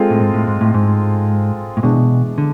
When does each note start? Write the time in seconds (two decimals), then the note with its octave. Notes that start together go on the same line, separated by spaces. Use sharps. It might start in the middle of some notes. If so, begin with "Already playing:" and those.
Already playing: G#3 C4 F4 A4
0.10 A2
0.20 G#2
0.34 A2
0.47 G#2
0.61 A2
0.74 G#2
1.77 A2
1.83 B2 E3 G#3 D4
2.38 D3